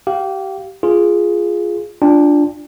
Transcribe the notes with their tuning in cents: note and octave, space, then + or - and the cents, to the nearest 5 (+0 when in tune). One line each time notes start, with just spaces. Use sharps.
G4 -25 F5 +0
F4 +0 G#4 +0
D4 +0 F4 +0 G5 +45